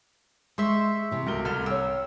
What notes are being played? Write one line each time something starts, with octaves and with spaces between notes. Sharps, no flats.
G#3 C5 E5 C6 C#6
C3 E3
C#2 A3 F#4 A#4 G7
C2 A4 B5 F6
C#5 G5 E6